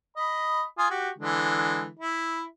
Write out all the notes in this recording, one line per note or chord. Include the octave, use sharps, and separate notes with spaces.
D#5 B5
F4 G#5 D#6
F#4 G4
D3 E3 G#3
E4